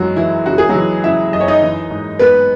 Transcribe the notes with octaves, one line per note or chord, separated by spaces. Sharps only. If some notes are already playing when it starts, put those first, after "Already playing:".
Already playing: F#2 E3 F#3 G#3 F#4
E3 E4
C#3 F#4
G#4
F#3 F#4
E3
C#3 E4 E5
F#2 D#5
C#5
D#4 D#5
E3
G#2
G#2 B3 B4